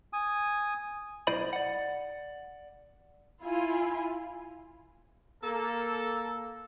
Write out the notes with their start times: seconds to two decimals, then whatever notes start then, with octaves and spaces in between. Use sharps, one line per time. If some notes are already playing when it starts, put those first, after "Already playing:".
0.13 G#5 D#6
1.27 B1 E4 C5 D5 D#5 B5
1.53 D5 F#5
3.42 E4 F4 G#5
5.43 A#3 A4